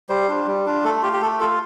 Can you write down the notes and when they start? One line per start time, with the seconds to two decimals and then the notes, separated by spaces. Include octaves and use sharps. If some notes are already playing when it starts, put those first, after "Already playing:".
0.09 G3 C5
0.28 D4 F4
0.47 G3
0.66 D4 F4
0.84 A3 A4
1.03 F4 G4
1.13 G4
1.21 A3 A4
1.40 F4 A4